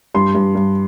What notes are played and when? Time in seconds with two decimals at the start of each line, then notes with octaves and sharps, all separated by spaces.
0.15 G2 C6
0.35 G2
0.55 G2